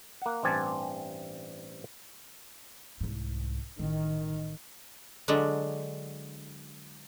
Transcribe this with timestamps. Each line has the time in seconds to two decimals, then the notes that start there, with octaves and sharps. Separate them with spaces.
0.22 A#3 F#5
0.44 A1 G2 C4 D5 G#5 A5
3.01 C2 G#2
3.79 A1 D#3
5.28 D3 F#3 G#3 D4